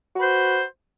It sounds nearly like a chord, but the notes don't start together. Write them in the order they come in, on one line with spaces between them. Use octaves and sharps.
F#4 B4 C5